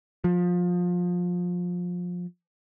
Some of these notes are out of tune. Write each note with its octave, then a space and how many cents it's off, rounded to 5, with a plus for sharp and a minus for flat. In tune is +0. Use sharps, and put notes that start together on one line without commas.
F3 +25